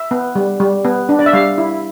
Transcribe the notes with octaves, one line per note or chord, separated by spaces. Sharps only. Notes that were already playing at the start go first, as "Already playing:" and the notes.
Already playing: E5
B3
G3
G3
B3
D4
D5
E5
G3 F5
E4